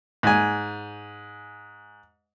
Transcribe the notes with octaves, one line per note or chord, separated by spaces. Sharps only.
G#2 G#5